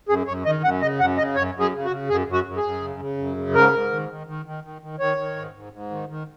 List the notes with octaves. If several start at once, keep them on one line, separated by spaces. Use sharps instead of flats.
F#2 G#4
F#2 C#5
D#3 D#5
F#2 F#5
C#3 D#5
F#2 F#5
C#3 D#5
F#2 C#5
F#2
G#4
C#3
F#4
C#3
F#2 G#4
F#2
F#4
F#2
G#4
F#2
C#3
C#3
F#2
C#3
G#2 A#4
G#2
D#3
D#3
D#3
D#3
D#3
D#3
D#3 C#5
D#3
G#2
G#2
G#2
D#3
D#3